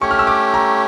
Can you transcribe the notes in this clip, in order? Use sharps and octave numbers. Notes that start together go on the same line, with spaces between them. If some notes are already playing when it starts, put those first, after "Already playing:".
A3 C#4 G4 C#5 C#6
F6
E6
D6
A#5